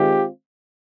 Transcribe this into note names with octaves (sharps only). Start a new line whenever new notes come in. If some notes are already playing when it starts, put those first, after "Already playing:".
Already playing: D#3 G#3 C4 F4 G4